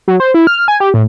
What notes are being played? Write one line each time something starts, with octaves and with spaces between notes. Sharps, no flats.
F#3
C5
E4
F6
G#5
G4
A2